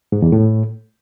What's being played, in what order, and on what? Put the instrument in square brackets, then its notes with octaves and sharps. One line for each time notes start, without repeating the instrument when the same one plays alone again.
[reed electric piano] G#2
E2
A2